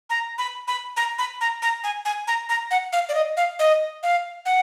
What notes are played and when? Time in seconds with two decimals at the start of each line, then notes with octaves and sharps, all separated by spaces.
0.10 A#5
0.38 B5
0.68 B5
0.97 A#5
1.18 B5
1.41 A#5
1.62 A#5
1.84 G#5
2.05 G#5
2.27 A#5
2.49 A#5
2.71 F#5
2.93 F5
3.09 D5
3.15 D#5
3.37 F5
3.59 D#5
4.03 F5
4.46 F#5